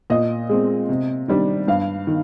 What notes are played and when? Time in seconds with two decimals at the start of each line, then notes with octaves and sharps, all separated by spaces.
0.10 A#2 D#5
0.49 G#3 C4
0.89 C3
1.28 D#3 G3 D4
1.68 G2 F5
2.07 D#3